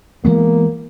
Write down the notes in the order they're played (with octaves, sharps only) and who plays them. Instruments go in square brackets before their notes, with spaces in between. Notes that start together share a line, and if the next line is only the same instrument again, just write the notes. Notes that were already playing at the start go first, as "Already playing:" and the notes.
[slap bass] E3 G#3 B3 [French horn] A#3